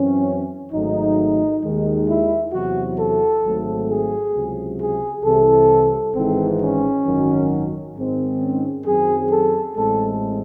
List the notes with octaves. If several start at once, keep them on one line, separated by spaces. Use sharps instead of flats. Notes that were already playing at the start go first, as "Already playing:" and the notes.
Already playing: F#2 E3 C4 C#4
G#1 G#2 F#3 A3 D#4
D#2 D#3 G#3
E4
E2 C3 F#3 F#4
A4
G#1 G#2 F#3 A3 C4
G#4
C#2 C3 F#3
G#4
C2 C3 E3 C4 A4
G#1 G#2 E3 C4
C#4
G#1 F#2 D#3 F#3
G#2 D#3 G#3 C4
C#4
F#2 D#3 F#3 C4 G#4
A4
A1 A2 G#3 C4 A4